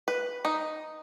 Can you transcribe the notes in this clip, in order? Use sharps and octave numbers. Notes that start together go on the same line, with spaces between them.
B4
D#4